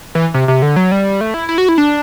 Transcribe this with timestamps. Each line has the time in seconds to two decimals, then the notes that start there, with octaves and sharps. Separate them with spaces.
0.15 E3
0.34 C3
0.48 C3
0.62 D3
0.76 F#3
0.92 G3
1.21 A3
1.34 E4
1.49 E4
1.58 F#4
1.69 E4
1.78 D4